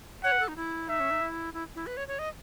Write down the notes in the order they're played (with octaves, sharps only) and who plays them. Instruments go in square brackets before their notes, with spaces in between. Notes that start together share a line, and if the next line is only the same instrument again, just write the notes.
[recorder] C#5 [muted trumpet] F#5
[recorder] B4
A4
D#4
E4
[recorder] D#4 [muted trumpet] E5
[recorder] C#4
D#4
E4
E4
E4
B4
C#5
C#5
D#5